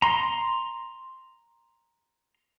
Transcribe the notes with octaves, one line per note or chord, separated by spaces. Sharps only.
A#5 C6